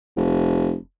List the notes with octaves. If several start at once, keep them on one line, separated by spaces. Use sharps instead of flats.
F1